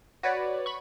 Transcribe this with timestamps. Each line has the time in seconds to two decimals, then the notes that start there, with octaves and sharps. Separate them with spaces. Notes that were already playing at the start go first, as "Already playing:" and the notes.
0.23 F#4 B4 C#5 D5
0.66 B5 C#6